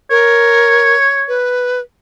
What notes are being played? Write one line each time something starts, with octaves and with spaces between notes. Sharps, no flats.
A#4 C#5
B4